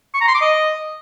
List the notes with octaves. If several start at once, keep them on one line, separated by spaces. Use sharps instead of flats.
C#6
A#5
C6
D6
D#5